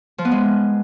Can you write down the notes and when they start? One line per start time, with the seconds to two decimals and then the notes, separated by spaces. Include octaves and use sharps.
0.18 F3
0.25 B3
0.31 G#3